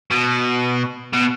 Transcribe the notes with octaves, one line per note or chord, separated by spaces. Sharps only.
B2
B2